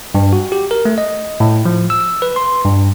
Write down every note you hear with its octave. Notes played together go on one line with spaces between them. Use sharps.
G2
F#4
G4
A#4
A3
D#5
A2
F3
E6
B4
C6
G2